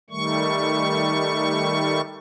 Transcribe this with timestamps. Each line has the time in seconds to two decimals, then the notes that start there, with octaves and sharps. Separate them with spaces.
0.10 D#3 G3 A3 C#6